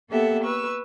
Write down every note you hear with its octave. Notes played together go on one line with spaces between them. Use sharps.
A#3 B3 G4 A4 E5 F#5
B4 C#6 E6